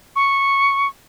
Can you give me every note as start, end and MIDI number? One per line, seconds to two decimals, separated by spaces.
0.15 0.88 85